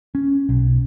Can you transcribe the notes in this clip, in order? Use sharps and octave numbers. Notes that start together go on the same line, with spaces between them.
C#4
B1